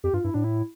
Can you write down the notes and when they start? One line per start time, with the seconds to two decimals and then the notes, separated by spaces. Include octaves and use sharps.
0.04 F2 G4
0.13 G2 F4
0.24 G2 E4
0.34 A2 D4
0.44 E4